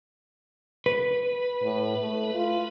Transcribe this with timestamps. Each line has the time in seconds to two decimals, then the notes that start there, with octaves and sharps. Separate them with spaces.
0.86 B4
1.62 A2
1.98 A3
2.34 F4